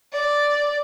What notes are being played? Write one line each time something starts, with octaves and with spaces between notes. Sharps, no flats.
D5